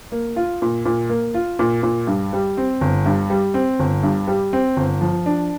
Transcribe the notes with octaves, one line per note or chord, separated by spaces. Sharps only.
A#3
F4
A#2
A#2
A#3
F4
A#2
A#2
G2
G3
C4
G1
G2
G3
C4
G1
G2
G3
C4
G1
F3
D4